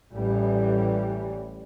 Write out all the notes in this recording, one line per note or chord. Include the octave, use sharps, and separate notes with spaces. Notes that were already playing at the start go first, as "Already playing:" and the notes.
A1 E3 G3